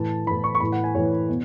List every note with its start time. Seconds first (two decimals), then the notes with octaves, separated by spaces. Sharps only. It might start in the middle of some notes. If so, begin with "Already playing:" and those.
Already playing: A2 E3 A5
0.26 A2 E3 B5
0.44 C#6
0.55 C#6
0.60 A2 E3 B5
0.72 F#5
0.84 G#5
0.95 A2 E3 C#5
1.29 B2